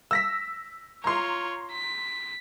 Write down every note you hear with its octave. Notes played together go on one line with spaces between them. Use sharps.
E6 A#6 B6
F4 C#5 A#5 C6
B6